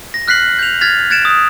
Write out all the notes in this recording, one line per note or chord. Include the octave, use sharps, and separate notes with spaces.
A#6
F6 F#6 B6 C7 F#7
G6 F7
F6 G#6 A6 B6 F7
F#6 G#6 A6 C#7 D7 E7
D#6